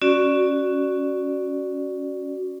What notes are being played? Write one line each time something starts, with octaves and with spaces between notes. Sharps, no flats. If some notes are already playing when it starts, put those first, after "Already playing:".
C#4 F#4 D5